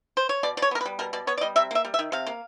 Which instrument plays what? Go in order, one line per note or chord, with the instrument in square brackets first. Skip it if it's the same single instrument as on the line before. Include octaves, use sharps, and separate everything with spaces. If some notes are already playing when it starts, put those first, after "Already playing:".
[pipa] C5
C#5
B2 D5
B2 D5
C#5
B3 A#4
B4
G3
B2 A#4
B2 D5
B3 C#5
D5
G3 D#5
C3 E5
A#3 E5
G3
E5
D#3
C3 F5
A#3